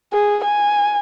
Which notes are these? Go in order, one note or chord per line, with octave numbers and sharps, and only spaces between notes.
G#4
G#5